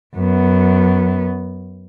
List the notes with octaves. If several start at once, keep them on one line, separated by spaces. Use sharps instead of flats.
F#2 B3